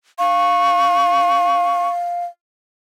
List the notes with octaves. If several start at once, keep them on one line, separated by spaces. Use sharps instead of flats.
F5 C#6